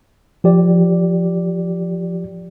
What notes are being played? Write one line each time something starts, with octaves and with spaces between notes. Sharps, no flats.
F3 G4 D5